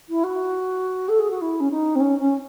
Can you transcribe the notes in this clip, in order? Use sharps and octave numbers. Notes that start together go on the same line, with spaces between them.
E4
F#4
A4
G#4
F#4
E4
C#4
D#4
C4
C#4
C#4